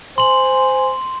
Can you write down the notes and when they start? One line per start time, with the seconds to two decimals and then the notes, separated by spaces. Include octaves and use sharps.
0.18 C5 G#5 C6 F#7